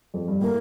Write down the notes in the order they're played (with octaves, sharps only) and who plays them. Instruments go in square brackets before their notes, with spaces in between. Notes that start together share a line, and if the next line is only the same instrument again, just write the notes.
[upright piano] F2
G2
[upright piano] A2 [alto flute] A#3